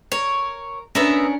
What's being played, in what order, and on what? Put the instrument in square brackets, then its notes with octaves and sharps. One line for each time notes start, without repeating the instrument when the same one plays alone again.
[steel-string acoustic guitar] A#4 [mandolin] C#5
[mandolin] B3 E5 A#5 [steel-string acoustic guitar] C#4 D4 A#4